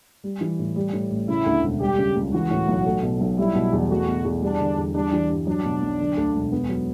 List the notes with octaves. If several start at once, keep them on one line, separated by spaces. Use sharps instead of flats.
G3
E3
A2
G3
A2
A1
C#3 E4
D2
E1
G3 G4
C#3
C#2
E3 F#4
A2
B1
A3
B2
B1
G3 E4
B2
E2
A3 F#4
B2
E2
G3 D4
D3
E2
G3 D4
E3
G2
F#3 D4
B2
B1
D3
D2
E1
B3
F#3